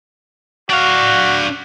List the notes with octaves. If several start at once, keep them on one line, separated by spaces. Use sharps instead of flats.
D4 F#4 F5